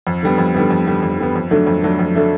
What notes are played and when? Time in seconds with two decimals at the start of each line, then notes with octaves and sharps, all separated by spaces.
0.07 F2
0.23 D3 G3 B3
0.38 F2
0.54 D3 G3 B3
0.70 F2
0.87 D3 G3 B3
1.03 F2
1.19 D3 G3 B3
1.35 F2
1.51 D3 F#3 A3 D4
1.67 F2
1.83 D3 F#3 A3 D4
1.99 F2
2.15 D3 F#3 A3 D4